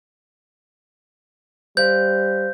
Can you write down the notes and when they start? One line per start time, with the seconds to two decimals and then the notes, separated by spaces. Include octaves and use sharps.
1.77 G3 C5 F5 G6